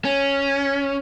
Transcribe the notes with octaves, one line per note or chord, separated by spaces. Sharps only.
C#4